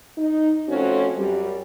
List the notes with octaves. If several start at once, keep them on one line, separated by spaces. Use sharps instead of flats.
D#4
F2 A3 C4 C#4 F#4
F#2 G3